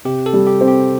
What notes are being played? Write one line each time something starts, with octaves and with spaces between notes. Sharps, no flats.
C3 G4
A4
G3
G4
C4
G4